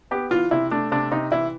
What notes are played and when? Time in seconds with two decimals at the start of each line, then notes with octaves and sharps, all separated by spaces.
0.11 B3 G4
0.31 E3 F4
0.51 C3 E4
0.71 A3 D4
0.92 C3 D4
1.11 C3 D#4
1.32 E3 E4